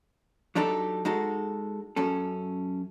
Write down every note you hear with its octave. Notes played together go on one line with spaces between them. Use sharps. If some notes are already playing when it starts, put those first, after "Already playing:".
F#3 D4 D#4 G4 A4
G#3 D#4 F#4 A4
F#2 C#4 A4